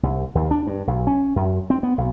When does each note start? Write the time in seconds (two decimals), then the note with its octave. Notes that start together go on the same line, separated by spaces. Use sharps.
0.03 C2
0.35 D#2
0.51 D4
0.67 G2
0.87 B1
1.07 C#4
1.36 F#2
1.70 C4
1.83 B3
1.98 B1